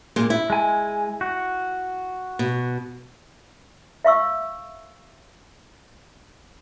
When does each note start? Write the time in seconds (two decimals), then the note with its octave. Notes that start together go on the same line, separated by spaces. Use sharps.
0.16 A#2 G#3
0.30 E4
0.50 G#3 G#5
1.21 F#4
2.39 B2
4.05 E5 F5 C#6 E6